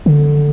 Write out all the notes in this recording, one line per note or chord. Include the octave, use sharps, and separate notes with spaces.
D3